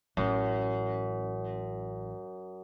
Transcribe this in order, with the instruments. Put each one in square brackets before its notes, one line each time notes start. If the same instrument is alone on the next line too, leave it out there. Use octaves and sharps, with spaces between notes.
[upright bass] A1 [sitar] F#2